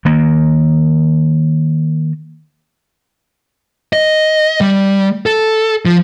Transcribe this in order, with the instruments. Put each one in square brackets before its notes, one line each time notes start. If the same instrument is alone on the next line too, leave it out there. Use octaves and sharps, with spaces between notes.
[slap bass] D#3 A#3
[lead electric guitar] D#5
G3
A4
F3